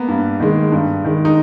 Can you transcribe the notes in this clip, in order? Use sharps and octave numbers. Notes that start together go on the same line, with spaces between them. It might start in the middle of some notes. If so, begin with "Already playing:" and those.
Already playing: A#3 B3
G2
D#3 G#3
G2
D#3 G#3
D#4